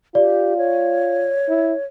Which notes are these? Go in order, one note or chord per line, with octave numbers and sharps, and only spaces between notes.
F4 G4 D5
C#5
E4